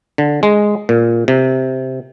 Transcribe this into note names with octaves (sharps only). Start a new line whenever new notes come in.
D3
G#3
A#2
C3